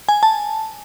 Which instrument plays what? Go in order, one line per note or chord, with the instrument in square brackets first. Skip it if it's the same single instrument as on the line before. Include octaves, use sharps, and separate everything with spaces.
[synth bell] G#5
A5